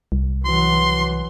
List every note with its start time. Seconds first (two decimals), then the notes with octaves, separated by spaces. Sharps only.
0.12 C2
0.45 E3 F#3 C6